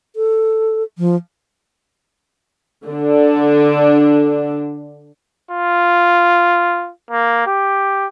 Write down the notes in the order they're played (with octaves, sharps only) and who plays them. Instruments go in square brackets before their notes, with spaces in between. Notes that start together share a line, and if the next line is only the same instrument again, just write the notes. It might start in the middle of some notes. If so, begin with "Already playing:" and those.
[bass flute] A4
F3
[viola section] D3 D4
[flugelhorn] F4
A#3
G4